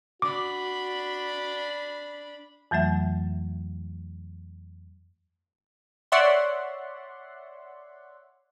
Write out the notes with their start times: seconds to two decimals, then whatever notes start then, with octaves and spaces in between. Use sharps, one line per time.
0.22 D4 F#4 B5 D6
2.71 F2 E3 F#3 A3 E5
6.12 C#5 D5 E5 F#5 C6